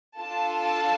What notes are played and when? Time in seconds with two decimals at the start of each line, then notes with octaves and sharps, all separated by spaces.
0.17 D4 F4 A4 A5
0.62 A5